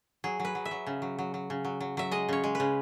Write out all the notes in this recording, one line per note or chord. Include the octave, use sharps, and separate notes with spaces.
F#3 G#4
F#3
B4
F#3
E5
F#3
C#3
F#3
F#3
F#3
C#3
F#3
F#3
F#3 E5
G#3 D#5
C#3 C#5
G#3
C#3 B4